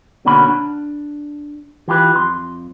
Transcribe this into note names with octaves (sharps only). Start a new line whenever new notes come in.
B2 D3 A#3 C#4 F#4 B5
D4
E3 F4 G4 B4
F2 C6